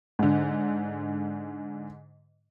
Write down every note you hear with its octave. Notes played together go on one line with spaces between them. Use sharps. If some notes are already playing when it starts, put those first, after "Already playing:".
G#2 D3